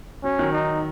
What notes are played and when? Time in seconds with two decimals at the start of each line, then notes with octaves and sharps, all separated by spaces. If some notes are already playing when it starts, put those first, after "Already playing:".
0.23 F#3 C#4
0.39 D#3 F#3
0.52 D#4